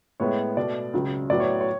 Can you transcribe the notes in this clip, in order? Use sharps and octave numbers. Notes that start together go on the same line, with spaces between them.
A2 G#3 B3 C#5
B2 A3 D5
C#2 C#3 F#3
A2 F#3 B3 D5
C#5
C#5